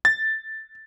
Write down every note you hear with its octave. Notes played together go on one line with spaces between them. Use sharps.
A6